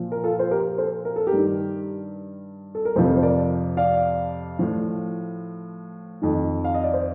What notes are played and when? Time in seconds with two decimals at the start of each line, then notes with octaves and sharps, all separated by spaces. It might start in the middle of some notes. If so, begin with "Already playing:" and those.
Already playing: A#2 F3
0.12 A#4
0.24 F4 A4
0.39 C5
0.51 G4 A#4
0.78 A4 C5
1.05 A#4
1.16 A4
1.27 G4 A#4
1.32 G2 D#3
2.75 A4
2.85 A#4
2.96 F2 C3 F3 A4 C5
3.17 C5
3.23 A#4 D5
3.77 D5 F5
4.59 A2 F3
6.22 F2 D#3
6.64 F5
6.74 D#5
6.84 D5
6.94 C5